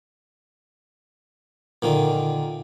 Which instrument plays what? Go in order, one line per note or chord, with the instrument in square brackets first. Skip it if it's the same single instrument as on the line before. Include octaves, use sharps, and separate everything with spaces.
[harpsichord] A#2 D3 D#3